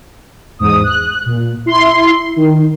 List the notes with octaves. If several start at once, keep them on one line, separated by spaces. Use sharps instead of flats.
E2 G#2 D#6
F#6
A#2
E4 C6
D#3